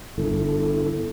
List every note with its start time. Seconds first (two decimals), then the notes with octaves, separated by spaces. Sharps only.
0.18 G1 E4 A4